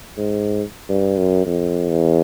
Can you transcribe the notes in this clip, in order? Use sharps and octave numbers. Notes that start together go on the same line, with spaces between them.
G#2
G2
F#2
F2
E2